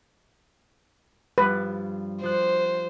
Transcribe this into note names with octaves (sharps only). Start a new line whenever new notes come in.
G2 F3 G3 B4
F3 C5 F#6